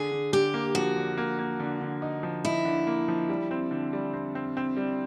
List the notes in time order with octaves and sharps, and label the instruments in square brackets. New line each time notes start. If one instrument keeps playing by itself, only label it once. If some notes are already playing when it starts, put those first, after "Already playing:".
Already playing: [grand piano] D3 [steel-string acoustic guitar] G#4
[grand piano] D3
[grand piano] D3 [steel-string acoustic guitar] G4
[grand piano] A#3
[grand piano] F3 [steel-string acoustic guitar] F#4
[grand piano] D3
A#3
A#3
D3
D3
D#4
F3
[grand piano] D#4 [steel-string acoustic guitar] E4
[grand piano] D3
A#3
F3
G3
C4
D3
G3
C4
C4
C4
G3